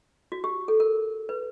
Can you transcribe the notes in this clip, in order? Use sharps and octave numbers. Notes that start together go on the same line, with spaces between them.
F#4
G4
A4
A#4
B4